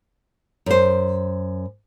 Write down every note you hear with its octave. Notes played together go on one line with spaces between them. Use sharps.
F#2 C5